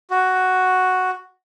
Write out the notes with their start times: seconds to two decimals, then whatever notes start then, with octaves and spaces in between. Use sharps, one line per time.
0.11 F#4